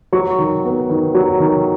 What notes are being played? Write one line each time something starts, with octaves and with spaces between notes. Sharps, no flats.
F#3 C#6
D#3
B3
D#3
F#3
D#3